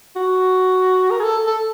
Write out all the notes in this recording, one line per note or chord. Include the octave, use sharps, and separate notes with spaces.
F#4
A#4
G#4
A4
A4